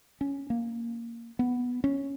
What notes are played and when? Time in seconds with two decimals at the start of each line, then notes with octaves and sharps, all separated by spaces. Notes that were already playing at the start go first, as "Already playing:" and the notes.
0.21 C#4
0.50 A#3
1.39 B3
1.84 C#4